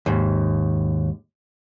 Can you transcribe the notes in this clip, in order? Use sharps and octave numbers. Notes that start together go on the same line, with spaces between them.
D#2 G#2